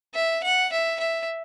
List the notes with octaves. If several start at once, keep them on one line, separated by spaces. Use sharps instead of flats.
E5
F#5
E5
E5